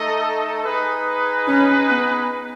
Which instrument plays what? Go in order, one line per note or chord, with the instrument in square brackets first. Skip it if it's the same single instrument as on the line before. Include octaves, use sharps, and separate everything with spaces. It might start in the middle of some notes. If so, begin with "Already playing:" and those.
Already playing: [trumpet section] A3 D#4 A4 D#5
D#4 G#4 B4
[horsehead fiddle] C#4
B3